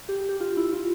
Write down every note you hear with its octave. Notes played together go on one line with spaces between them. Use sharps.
G4
G4
F4
E4
F4